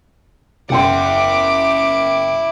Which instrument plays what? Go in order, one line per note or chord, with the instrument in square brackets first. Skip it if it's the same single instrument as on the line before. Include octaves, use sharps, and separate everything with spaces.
[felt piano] F#1 G5 C6 [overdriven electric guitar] E4 F#5 [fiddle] D6